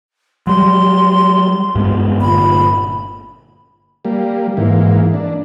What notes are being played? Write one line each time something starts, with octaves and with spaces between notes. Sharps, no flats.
F#3 G3 C6
G2 G#3 B3
G1 A#2 B5
G3 A#3
G#2 E3 A#3
D4